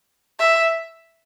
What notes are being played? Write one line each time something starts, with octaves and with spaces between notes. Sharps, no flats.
E5